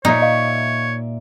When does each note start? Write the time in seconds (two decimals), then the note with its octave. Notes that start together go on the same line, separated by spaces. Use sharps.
0.05 A#2 D#4 C#5 D5 E5
0.22 D#5 F5 C#6